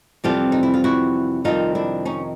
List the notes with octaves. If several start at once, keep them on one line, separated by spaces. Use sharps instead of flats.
F2 C3 E3 G3 C4 F4 G4
D#4
E4
F4
E4 F#4
F2 C3 D#3 G3 D#4 F4
D4 E4
C#4 D#4